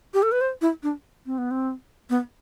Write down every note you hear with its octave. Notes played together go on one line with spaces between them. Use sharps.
G4
A4
B4
C5
E4
D4
C4
B3
C4
B3